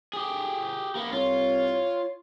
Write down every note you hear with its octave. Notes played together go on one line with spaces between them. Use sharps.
G4 G#4
A#3 B3
C2 F4 C#5